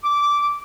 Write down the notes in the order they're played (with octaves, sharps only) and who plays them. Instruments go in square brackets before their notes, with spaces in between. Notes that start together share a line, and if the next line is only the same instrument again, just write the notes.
[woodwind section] D6